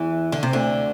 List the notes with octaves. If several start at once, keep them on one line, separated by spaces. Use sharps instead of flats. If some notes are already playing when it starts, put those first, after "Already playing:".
Already playing: E2 E3
D3
C3
D2 D3